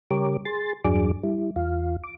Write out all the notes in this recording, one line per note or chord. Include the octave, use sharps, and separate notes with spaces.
C#3 G3 G4 A#4 C#5 D6
G#4 C6 A6
E2 G2 F#3 D4 G#4 D6
G3 E4
E2 F4 F5
D6